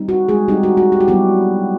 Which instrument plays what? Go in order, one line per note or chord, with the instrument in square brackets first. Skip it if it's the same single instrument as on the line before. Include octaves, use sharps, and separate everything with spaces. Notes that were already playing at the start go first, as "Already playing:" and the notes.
Already playing: [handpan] G3 C4 D#4
F#4
G#3 G#4
G3 C4 D#4 G4
F#4
F#4
G4
F#4
F#3 G3 B3 E4 G4